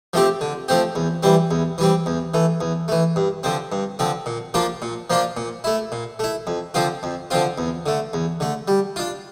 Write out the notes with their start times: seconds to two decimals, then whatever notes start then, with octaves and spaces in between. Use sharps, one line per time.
0.13 F3 A3 C4 G4
0.41 D3
0.68 F3 A3 C4 G4
0.95 E2
1.23 E3 G3 C4
1.51 E2
1.78 E3 G3 C4
2.06 E2
2.34 E3 A3
2.61 E2
2.88 E3 A3
3.16 G2
3.43 D3 F3 C4
3.72 G2
3.99 D3 F3 C4
4.26 A#2
4.54 F3 A#3 D4 F4
4.82 A#2
5.10 F3 A#3 D4 F4
5.37 A#2
5.64 A3 E4
5.92 A#2
6.19 A3 E4
6.47 F2
6.74 D3 F3 C4 F4
7.03 F2
7.31 D3 F3 C4 F4
7.58 E2
7.86 D3 A3
8.13 E2
8.40 D3 A3
8.68 G3
8.96 D4 F4